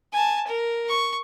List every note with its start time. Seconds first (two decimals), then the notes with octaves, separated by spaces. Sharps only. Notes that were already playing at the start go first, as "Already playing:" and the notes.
0.13 G#5 A5
0.47 A#4
0.89 C#6